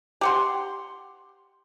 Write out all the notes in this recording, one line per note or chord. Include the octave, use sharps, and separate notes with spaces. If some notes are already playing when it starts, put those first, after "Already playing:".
G4 F#5 C6